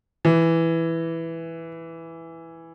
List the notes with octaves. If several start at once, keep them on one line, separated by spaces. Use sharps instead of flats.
E3